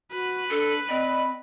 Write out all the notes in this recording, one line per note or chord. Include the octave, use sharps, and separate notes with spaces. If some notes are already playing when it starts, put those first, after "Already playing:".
F#4 B4
D4 A4
C4 D5 D#5 B5